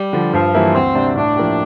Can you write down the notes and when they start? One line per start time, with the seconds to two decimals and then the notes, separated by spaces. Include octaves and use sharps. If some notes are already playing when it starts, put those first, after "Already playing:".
Already playing: G3
0.13 D3 F3
0.33 G2 F3
0.54 E3 G3 A#3 E4
0.74 D2 C4
0.95 C3 G3 D4
1.16 A2 D4
1.36 F3 A#3 E4 G4